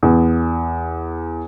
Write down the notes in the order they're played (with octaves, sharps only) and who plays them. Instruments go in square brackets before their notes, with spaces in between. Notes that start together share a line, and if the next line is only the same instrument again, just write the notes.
[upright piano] E2